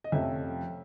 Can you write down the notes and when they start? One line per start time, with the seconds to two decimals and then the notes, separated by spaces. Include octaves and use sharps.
0.04 D#5
0.12 F2 C3 F3 A3 C#4 E5